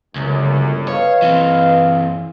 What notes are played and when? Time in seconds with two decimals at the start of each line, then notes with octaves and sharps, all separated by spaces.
0.16 G1 C#2 F#2
0.88 B4 C#5 D#5 F5
1.22 E3 C4